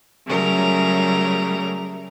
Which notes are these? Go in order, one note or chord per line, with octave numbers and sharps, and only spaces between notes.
C#3 F#3 G3 A3 A#4